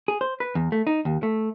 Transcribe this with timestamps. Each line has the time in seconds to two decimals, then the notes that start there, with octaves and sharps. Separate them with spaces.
0.08 G#4
0.21 C5
0.40 B4
0.55 E2
0.72 A3
0.87 D#4
1.05 D#2
1.23 A3